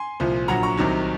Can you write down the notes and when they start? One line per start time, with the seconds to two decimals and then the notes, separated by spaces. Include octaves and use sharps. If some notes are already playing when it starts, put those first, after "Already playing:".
Already playing: G#5 C6
0.20 C2 A#2 F3
0.48 A#1 A#2 F#3 F#5 A#5
0.63 A#5 C#6
0.77 C2 C3 D#3 F#3